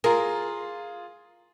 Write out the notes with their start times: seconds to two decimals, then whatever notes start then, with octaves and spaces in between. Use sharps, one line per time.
0.04 F4 G#4 A#4